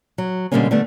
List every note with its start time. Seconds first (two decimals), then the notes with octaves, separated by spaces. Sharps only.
0.18 F#3
0.52 B2 D3 G3 G#3 A#3 C#4
0.71 D3 G3 A3 B3